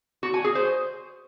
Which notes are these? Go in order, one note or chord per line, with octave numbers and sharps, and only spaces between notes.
F#4
G#5
G#4
C5